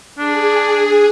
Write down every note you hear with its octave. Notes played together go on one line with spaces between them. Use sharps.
D4 G#4